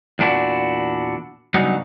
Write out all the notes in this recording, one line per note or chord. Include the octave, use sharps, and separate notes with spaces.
E2 A#2 D4 E4 F#4
G2 C#3 F#3 B3 D#4